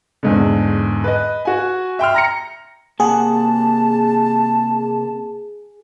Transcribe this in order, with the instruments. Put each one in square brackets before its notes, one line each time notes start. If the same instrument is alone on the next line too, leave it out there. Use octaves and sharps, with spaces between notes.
[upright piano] E2 G#2 D3
B4 D#5
F#4 G#5
E5 G5 C6 F6
A#5 A#6 C#7
[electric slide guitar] C3 A#3 F#5 [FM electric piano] G#4 [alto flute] A5